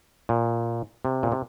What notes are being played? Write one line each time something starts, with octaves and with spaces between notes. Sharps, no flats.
A#2
C3
A#2
C3